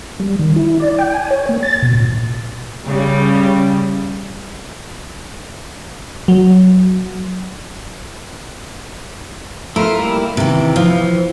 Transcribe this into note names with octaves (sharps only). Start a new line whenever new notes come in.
G3
D#3
E4
D5
G5
G#5
C#5
A#3
A6
B2
A#2
C#3 G3
F#3
A3 E4 F4 A#4
G3 A#3 E4
C3 D#3 E3
F3